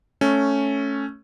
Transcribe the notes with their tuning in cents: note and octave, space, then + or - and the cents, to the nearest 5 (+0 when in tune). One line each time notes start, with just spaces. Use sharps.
A3 +0 C#4 +0